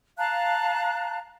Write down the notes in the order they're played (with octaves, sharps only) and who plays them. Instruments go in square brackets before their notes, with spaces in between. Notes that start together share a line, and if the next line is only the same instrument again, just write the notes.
[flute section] F5 A5 A#5 F#6